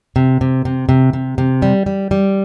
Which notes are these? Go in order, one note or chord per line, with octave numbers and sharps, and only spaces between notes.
C3
C3
C3
C3
C3
C3
G3
G3
G3